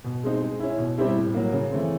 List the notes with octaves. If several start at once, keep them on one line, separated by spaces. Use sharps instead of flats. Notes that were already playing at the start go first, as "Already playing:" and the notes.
B2
G#3 C4 D#4
G#3
C#4 E4
B2
G3 C4 E4 G4
A2
F#3 A#3
C#3
E3 A3 C4